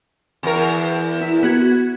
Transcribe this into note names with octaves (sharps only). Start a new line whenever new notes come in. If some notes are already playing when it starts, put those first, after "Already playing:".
E2 A#4
E4
B3 F#4 G#6